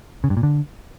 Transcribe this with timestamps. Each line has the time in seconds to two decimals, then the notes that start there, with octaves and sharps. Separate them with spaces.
0.24 C#3
0.30 G2
0.37 A#2
0.43 D3